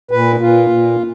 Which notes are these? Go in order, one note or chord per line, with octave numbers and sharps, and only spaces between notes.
A#2 B4
A#2 F4
A#2